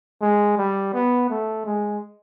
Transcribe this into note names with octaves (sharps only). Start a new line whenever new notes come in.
G#3
G3
B3
A3
G#3